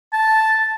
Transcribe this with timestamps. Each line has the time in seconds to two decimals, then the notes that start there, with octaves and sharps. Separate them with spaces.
0.13 A5